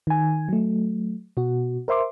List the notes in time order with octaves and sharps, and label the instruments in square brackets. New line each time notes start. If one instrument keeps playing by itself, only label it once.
[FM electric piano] D#3 G#5
F#3 A3
B2 F#4
A#4 C5 E5 C6 D6